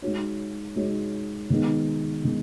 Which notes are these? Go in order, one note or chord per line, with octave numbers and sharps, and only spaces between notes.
G#3 D#4 F#4 C#5
G#3 D#4 F#4 C#5
D#3 G#3 B3 D#4
D#3 G#3 B3 D#4